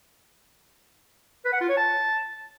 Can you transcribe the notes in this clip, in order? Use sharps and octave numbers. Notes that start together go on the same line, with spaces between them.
B4
F#5
F4
C#5
A5